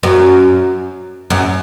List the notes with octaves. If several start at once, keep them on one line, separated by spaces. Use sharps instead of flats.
F#2
F#2